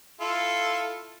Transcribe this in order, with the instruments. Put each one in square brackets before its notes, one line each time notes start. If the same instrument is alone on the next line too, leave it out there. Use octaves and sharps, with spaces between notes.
[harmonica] E4 F4 A4